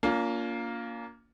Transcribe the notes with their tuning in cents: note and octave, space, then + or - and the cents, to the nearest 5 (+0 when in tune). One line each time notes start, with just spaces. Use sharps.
A#3 +0 C#4 +45 F4 +0